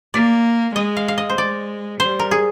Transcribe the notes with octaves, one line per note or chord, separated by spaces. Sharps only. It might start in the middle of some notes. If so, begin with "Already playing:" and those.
A#3 D5
G#3 D#5
F5
F5
D#5
C5
G#3 D5
G3 C5
A#4
G#4